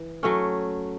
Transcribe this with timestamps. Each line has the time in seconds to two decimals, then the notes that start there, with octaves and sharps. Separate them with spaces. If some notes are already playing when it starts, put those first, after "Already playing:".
Already playing: E3
0.23 F#3 A3 C#4